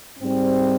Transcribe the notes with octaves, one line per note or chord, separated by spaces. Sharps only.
G#2 G3 C4